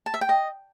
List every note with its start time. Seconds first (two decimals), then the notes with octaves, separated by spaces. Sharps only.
0.06 A5
0.14 E5
0.21 G5
0.29 D#5